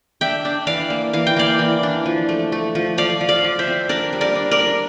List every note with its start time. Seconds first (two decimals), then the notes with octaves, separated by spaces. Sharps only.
0.21 D4 E5 G5
0.45 D4
0.67 E3 D5 F5
0.90 A#3
1.13 E3 F5
1.27 G5
1.37 A#3 D5 F5
1.59 E3
1.83 D4
2.06 F3
2.29 A3
2.52 A3
2.75 F3
2.98 F3 D5 F5
3.21 F3
3.29 D5 F5
3.44 F3
3.59 C5 E5
3.67 C4
3.89 D4 A#4 D5
4.13 G3
4.21 A#4 D5
4.35 D4
4.51 A#4 D5
4.60 D4